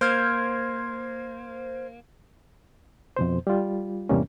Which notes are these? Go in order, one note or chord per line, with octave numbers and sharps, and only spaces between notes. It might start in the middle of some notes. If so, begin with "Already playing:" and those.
A#3 C5 F6 G#6
F2 B2 C5
G3 F4
E2 G#2 C3 G3 A#3 C#4